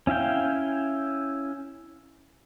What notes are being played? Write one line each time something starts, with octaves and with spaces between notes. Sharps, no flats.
C#4 E4 F5 G5